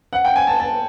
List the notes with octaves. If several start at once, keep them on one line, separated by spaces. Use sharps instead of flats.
F#5
G5
G#5
A5
A5